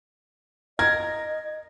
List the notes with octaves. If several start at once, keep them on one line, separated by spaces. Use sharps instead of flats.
A#4 D#5 G#6